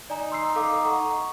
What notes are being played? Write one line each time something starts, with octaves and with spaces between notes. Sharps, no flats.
D#4 D5 G#5 A#5
C6 E6 C7
A4 F5 D6
F#5 A#5 C#6